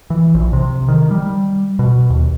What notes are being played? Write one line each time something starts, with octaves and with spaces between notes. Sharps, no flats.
E3
A#1
C3
D#3
G3
B2
D#2